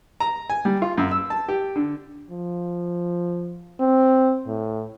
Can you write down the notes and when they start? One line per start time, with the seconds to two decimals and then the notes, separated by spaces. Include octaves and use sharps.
0.20 A#5
0.50 G#5
0.65 G3
0.82 F4
0.98 F#2
1.11 E6
1.30 A5
1.48 G4
1.76 D3
2.30 F3
3.80 C4
4.47 A2